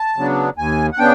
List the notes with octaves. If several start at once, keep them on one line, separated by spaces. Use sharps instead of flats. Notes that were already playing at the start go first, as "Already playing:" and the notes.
Already playing: A5
C#3 F#3 B3 D4
D#2 G#5
F#5
C#3 B3 D4 G5